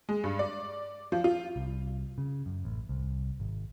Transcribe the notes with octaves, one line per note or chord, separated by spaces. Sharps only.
G#3
G2
D5
F3
F4
C2
C#3
F#2
A1
C2
G#1